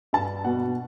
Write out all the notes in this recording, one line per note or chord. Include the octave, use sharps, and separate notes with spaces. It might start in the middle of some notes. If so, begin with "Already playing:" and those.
G2 A5
B2 F#5